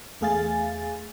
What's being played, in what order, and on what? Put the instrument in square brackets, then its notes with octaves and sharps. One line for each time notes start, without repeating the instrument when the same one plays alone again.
[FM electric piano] E2 A3 G#4 F5 G#5 A6